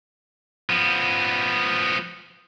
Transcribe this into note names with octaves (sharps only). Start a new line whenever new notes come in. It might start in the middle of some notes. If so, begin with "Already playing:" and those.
F3 B3